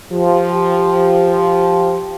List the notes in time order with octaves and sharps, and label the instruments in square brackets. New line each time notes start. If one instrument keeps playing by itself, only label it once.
[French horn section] F3 G4